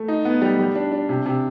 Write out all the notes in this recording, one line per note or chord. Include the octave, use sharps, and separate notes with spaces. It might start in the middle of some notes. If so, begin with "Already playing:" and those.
Already playing: A3
D#4
B3
G3
G3
D4
D4
C3
C3